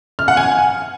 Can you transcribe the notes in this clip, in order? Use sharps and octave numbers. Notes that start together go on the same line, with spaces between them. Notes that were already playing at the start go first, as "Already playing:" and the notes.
F6
F#5
G#5